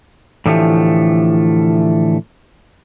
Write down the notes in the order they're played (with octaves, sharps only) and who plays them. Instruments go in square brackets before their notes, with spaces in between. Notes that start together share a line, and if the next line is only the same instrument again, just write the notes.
[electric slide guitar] A2 D3 E3 F3 A3 G4